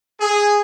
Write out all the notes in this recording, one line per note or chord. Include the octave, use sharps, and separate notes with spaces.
G#4